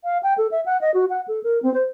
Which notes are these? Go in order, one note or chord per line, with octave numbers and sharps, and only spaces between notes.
F5
G5
A4
E5
F#5
D#5
F#4
F#5
A4
A#4
C4
C5